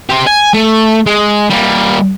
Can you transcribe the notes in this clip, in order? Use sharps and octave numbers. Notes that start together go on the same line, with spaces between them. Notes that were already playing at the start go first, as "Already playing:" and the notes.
G4 C5
G#5
A3
G#3
G3 A#3